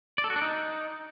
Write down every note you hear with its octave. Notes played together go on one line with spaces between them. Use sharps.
D5
A4
F#4
D4
D#4